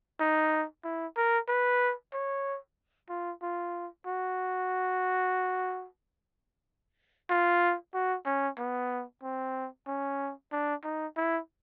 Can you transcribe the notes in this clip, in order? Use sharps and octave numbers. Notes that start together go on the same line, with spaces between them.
D#4
E4
A#4
B4
C#5
F4
F4
F#4
F4
F#4
C#4
B3
C4
C#4
D4
D#4
E4